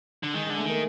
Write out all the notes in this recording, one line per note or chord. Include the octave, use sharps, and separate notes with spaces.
D3
D#3 G#3
G#3
D3
A3
D#3 A#3